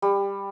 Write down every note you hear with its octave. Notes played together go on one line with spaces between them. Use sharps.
G3